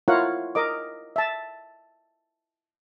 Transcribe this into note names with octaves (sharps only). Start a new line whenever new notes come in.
E4 F4 A#4 C#5 F5 F#5
A#4 D#5 D6
E5 A5